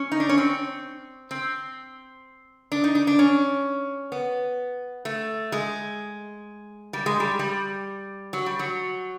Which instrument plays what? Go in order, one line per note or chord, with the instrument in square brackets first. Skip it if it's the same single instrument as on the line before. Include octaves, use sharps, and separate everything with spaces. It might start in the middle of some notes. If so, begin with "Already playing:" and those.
Already playing: [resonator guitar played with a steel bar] C#4
D#4
D4
C#4
C4
C4
D4
D#4
D4
D4
C#4
B3
A3
G#3
G3
G#3
G3
G3
F#3
G3
F#3